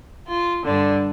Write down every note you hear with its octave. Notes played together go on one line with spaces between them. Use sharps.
F4
G2 D3 D4